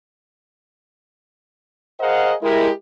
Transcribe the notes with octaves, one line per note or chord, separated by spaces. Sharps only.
G#4 A#4 C5 D#5 F5 F#5
G#3 E4 G4 A#4